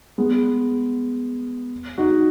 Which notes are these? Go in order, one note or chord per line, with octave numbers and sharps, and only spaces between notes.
G#3 B3
D#4 F#4